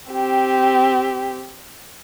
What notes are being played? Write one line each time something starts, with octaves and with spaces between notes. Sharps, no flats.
C4 G4